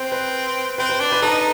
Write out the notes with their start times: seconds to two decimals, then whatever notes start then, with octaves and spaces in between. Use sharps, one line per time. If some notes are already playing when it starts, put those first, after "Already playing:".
Already playing: C4 C5
0.12 B4
0.78 C4 B4
0.89 B4
1.00 D4
1.12 B4
1.22 D#4 A4